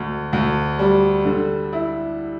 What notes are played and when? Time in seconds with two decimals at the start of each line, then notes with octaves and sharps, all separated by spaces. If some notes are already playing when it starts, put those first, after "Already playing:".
Already playing: D2
0.33 D2
0.79 G3
1.25 D3
1.72 E4